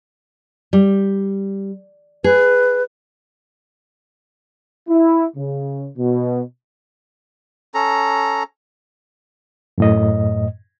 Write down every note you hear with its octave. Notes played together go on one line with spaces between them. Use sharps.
G3
G#4 B4
E4
C#3
B2
C#4 A4 A#5
F#2 A2 D#5